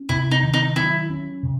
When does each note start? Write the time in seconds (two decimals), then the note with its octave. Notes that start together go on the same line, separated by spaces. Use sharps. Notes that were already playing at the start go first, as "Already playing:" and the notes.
Already playing: C#4
0.09 C3 E4
0.31 D#4
0.43 D#3
0.53 D#4
0.76 F#3 E4
1.10 C#4
1.43 C3